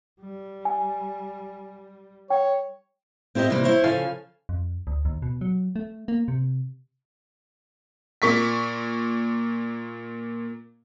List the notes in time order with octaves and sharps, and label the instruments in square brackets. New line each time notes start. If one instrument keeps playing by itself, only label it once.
[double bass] G3
[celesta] G#5
[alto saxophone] C#5 [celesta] G5
[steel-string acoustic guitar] C4 E4 G4 B4 D#5
C3 E3 G3 A#3
E4 C5 C#5
C#3 F3 C#4 A4 F5 G#5
[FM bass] F2
D2
D#2
B2
F#3
A3
A#3
C3
[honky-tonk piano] A#2 A#3 C#6 B6